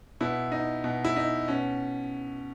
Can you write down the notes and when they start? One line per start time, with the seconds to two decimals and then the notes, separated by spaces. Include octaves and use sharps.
0.21 B2 E4
0.52 D#4
0.84 B2
1.05 E4
1.16 D#4
1.48 B2 C#4